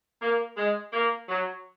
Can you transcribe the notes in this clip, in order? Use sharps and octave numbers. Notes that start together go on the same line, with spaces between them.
A#3
G#3
A#3
F#3